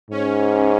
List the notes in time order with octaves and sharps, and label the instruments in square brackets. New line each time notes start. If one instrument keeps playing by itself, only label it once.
[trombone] G#2 [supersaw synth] C#4